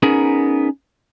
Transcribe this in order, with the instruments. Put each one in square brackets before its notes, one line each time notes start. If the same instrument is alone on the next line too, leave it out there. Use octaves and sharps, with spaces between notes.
[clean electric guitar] B3 C#4 D#4 G#4 A#4